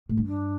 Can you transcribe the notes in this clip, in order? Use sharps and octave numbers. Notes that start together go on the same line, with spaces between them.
A2
G2
D4